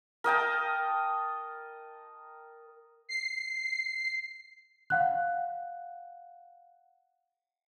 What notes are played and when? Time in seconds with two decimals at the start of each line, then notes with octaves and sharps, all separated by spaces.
0.24 A#4 D#5 G5 A5
3.09 C7
4.90 F5 F#5 F#6